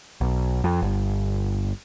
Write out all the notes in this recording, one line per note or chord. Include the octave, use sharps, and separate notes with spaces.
B1
F2
G1